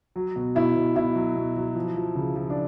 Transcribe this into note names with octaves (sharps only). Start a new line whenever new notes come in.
F#3
B2
B2 E4
B2
B2 E4
F#3
B2
F#3
F3
F3
C#3
F3
D4